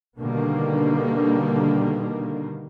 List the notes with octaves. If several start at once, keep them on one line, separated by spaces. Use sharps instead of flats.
B2 D3 D#3 G3 A#3